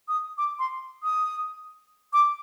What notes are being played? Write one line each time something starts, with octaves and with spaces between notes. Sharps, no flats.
D#6
D6
C6
D#6
D6